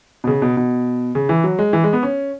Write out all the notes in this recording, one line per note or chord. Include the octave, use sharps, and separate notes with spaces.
B2
C#3
B2
B2
C#3
E3
F#3
G#3
E3
G#3
B3
C#4